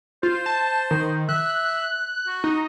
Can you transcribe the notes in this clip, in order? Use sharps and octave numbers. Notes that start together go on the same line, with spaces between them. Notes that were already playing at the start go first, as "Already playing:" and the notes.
F4 C5
A5
D#3
E5 F#6
F#4
D#4